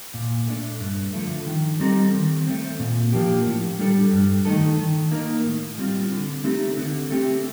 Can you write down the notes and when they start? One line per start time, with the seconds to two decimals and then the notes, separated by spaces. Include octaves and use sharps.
0.14 A#2
0.48 A3 D4
0.80 G2
1.13 D3 F3 A3
1.46 D#3
1.80 G3 C4 D#4 A4
2.13 D#3
2.47 A3 C4
2.79 A#2
3.12 F3 A#3 D4 G4
3.46 A2
3.79 G3 D4 A4
4.13 G2
4.45 D#3 A3 D#4 A4
4.78 D#3
5.11 A#3 D#4
5.45 A2
5.78 G3 C4 F4
6.11 D3
6.44 A3 C4 D#4 G4
6.77 D3
7.10 A3 C4 G4